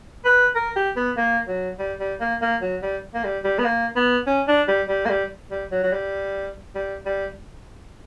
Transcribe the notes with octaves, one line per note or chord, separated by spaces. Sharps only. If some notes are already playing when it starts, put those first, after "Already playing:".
B4
A#4
G4
B3
A#3
F#3
G3
G3
A#3
A#3
F#3
G3
A#3
G3
G3
B3
A#3
B3
C#4
D4
G3
G3
A#3
G3
G3
F#3
F#3
G3
G3
G3